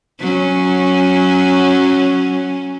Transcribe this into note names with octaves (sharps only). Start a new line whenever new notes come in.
F#3 C#4